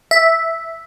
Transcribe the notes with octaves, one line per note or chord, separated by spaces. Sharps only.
E5